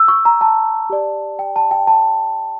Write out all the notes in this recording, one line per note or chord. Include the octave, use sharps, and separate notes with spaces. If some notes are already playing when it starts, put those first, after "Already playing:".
Already playing: E6
C#6
A#5
A5
G4 D5
G5
A5
G5
A5